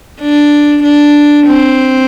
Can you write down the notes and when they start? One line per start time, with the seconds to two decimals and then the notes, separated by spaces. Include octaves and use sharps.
0.21 D4
0.83 D4
1.47 C4